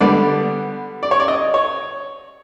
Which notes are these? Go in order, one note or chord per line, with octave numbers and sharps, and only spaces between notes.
D3 G3 B3 D5
D5
C#5
D5
D#5
C#5